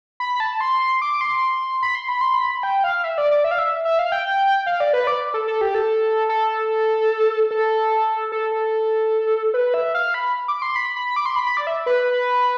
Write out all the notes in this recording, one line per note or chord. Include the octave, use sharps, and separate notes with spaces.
B5
A5
C6
D6
C6
B5
C6
B5
C6
B5
G5
F5
E5
D5
D5
E5
F5
E5
E5
F5
G5
F5
D5
B4
D5
A4
A4
G4
A4
A4
A4
A4
A4
B4
E5
F5
B5
D6
C6
B5
B5
D6
C6
B5
B5
D5
E5
B4